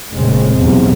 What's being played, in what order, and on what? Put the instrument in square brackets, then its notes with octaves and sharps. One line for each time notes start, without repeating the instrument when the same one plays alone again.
[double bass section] F1 A#2 C#3 G#3 C4
B1 E2 A2 C3